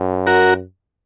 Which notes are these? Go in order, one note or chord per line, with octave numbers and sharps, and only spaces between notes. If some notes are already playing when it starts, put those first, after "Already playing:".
Already playing: F#2
F#4 A#4